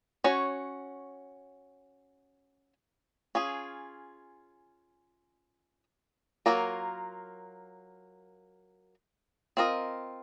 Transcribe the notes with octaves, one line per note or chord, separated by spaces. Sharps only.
C#4 F#4 C#5
C#4 F4 G#4
F#3 A#3 F4 A#4
C4 F4 A#4 D#5